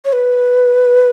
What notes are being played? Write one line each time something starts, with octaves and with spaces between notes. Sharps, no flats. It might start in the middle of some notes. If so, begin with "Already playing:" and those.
C#5
B4